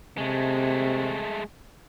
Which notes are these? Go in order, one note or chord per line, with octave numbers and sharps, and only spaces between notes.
C3 G#3 A3